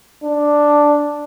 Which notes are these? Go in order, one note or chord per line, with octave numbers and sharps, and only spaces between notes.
D4